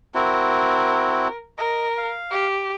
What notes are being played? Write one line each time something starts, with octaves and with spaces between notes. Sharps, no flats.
C4 E4 F#4 A#4
A#4 D#5
F5
G4